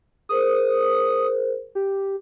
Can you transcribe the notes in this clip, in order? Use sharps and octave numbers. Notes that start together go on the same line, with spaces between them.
G#4 A#4 C5 D#6
G4